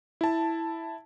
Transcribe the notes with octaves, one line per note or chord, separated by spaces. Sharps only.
E4 A5